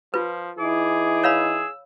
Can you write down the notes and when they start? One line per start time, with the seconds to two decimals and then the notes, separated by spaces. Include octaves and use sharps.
0.14 F3 F4 B4
0.59 E3 D#4 E4 G#4 D6
1.24 C#5 F5 B5 E6